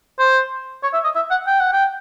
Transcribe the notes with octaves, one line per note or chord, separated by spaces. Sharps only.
C5
C#5
E5
D#5
E5
F#5
G5
F#5
G5